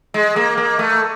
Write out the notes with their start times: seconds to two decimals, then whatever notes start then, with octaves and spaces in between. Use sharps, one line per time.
0.14 G#3
0.36 A#3
0.58 A#3
0.79 A3